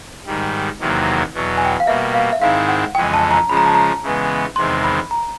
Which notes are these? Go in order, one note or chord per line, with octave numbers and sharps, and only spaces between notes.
G#2 D#3 G3
E2 C3 D#3 F#3 A#3
E2 B2 F#3
G#5
G5
F#5
F5
B2 G3 A#3 E5
F5
E5
G#2 D#3 G#3 C4 E4 F5
F#5
F2 C#3 E3 G#3 C#4 G5
A5
A#5
C#3 F3 G#3 B5
A#5
A5
A#5
C#3 E3 G#3 B3
E2 C3 D#3 G#3 C4 C6
B5
A#5